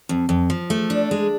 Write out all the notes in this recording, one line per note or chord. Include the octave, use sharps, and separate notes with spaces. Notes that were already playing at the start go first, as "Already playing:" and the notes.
F2
F2
F3
A3
D4
G#3